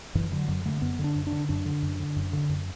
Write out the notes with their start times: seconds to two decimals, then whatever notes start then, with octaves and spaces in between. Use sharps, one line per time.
0.15 F#2 E3
0.32 D3 F#3
0.48 F#2 F#3
0.65 D3 A3
0.81 F#2 B3
0.99 D3
1.04 D4
1.16 F#2
1.27 D4
1.32 D3
1.49 F#2 D4
1.65 D3
1.83 F#2
1.99 D3
2.16 F#2
2.33 D3
2.49 F#2